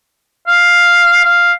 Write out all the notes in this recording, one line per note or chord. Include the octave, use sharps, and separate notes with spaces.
F5
F5